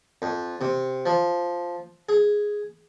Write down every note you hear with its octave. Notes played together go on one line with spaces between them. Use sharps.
F2
C3
F3
G#4